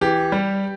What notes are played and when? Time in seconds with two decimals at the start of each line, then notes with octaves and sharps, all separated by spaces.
0.01 E3 G4
0.32 G3